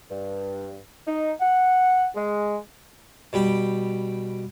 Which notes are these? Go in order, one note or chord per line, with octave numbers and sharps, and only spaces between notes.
G2
D#4
F#5
G#3
B2 G3 G4 G5